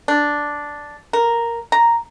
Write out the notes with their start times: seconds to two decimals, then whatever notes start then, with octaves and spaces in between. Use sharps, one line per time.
0.08 D4
1.13 A#4
1.72 A#5